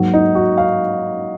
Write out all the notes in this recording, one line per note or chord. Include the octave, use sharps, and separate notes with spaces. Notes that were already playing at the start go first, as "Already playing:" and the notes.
Already playing: G#2 F#3 A#3
D#4
F#4
F5